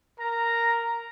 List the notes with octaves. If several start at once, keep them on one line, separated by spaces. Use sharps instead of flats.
A#4 A#5